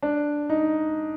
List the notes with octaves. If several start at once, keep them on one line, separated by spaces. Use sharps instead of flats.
D4
D#4